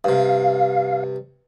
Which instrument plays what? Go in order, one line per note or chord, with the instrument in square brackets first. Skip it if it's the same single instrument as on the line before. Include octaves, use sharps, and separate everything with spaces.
[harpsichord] G2 C3 [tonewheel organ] F5